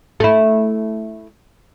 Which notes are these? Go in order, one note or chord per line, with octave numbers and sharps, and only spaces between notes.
A3 E4